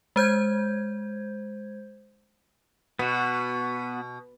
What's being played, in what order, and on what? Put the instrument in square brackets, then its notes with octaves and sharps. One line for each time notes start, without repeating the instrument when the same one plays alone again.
[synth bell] G#3 C5 G6 G#6
[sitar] B2 [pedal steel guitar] B3 F#4